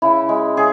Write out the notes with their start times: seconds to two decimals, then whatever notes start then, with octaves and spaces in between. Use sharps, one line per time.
0.02 C#3 E4
0.29 G#3
0.57 C#3 G#4